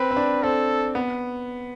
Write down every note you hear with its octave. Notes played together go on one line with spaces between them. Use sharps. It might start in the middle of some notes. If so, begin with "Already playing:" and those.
Already playing: C4 B4
C4
D4
C4 A4
B3